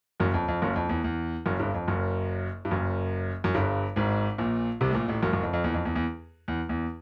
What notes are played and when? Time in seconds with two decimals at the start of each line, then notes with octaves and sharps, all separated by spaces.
0.20 F#1 F#2
0.34 F2
0.48 F2
0.62 F#1 F#2
0.76 F2
0.89 E2
1.04 E2
1.46 F#1 F#2
1.60 G1 G2
1.74 F2
1.88 F#1 F#2
2.65 G2
2.71 F#1 F#2
3.44 F#2
3.54 G1 G2
3.96 G#1 G#2
4.38 A#1 A#2
4.81 C2 C3
4.90 A2
4.94 A#1 A#2
5.08 A1 A2
5.23 F#1 F#2
5.33 F#1 F#2
5.43 F2
5.53 F2
5.64 E2
5.74 F2
5.85 E2
5.96 E2
6.48 E2
6.69 E2